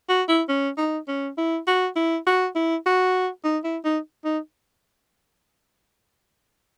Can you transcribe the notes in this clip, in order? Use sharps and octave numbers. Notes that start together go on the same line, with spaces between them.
F#4
E4
C#4
D#4
C#4
E4
F#4
E4
F#4
E4
F#4
D#4
E4
D#4
D#4